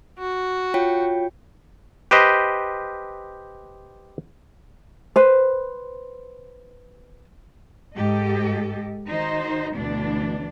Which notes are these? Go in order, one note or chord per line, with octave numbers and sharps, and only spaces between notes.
F#4
F4 C#5 G5
G4 B4 C5 D#5
B4 C5
G#2 G4 A4 D#5
D#3 D#4 F#4 C5
D2 B2 E3 D4